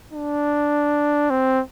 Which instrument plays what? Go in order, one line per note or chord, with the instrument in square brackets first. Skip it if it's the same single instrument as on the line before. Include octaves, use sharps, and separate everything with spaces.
[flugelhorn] D4
C4